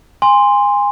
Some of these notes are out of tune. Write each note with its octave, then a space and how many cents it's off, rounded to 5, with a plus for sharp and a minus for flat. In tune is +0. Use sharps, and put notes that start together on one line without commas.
G#5 -25 C6 +0